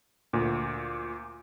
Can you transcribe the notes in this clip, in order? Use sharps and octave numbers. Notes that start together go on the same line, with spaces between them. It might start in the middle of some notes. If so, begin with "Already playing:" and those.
D2 A#2